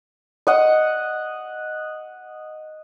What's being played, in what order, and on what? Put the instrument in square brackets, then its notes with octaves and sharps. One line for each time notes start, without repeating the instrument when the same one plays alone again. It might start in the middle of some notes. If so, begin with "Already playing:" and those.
[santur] D#5 F#5